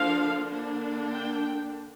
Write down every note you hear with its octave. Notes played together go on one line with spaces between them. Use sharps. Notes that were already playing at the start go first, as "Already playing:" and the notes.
Already playing: D3 F3 A#3 D4 F5
D3 A#3 D4
G5